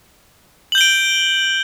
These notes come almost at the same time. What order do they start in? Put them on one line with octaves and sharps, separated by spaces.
F#7 G6 G7 D7